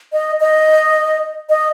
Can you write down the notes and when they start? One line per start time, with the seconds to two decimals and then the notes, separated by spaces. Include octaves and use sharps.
0.13 D#5
0.40 D#5
1.50 D#5